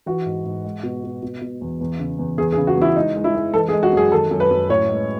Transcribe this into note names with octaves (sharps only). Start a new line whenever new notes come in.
E3 F#4
G#2
G#2
G#3
B2
B2
B2
B2
E2
E2
C#3
E2
E2 G#4
G#4
C#3
F#4
E2 E4
G#3 D#4
G#3
E4
G#3
E3 A4
G#4
G#3
F#4
F#2 G#4
D#3 A4
F#2
B4
F#2
A2 C#5
G#3